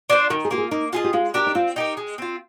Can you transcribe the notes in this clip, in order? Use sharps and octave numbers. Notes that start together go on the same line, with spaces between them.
D4 F4 C5
D#3 A#4
G#4
A#3 F4 G4
G#4
A#3 D#4
F4 G#4 D#5
G4
G#3 F4
D4 G4 A#4
D#4
C4 F4
D#4 G4 A#4
G#3
C4 F4